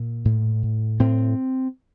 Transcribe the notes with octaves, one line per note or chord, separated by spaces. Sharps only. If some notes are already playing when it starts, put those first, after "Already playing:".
Already playing: A#2
A2
A2
A2 C4